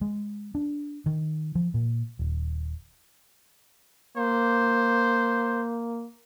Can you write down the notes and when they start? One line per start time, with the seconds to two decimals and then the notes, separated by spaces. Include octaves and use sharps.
0.01 G#3
0.55 D4
1.06 D#3
1.55 F3
1.74 A#2
2.19 D#1
4.17 A#3 C5